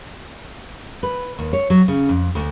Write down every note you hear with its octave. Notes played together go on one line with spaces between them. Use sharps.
B4
D#2
C#5
F#3
C#3
F2
D2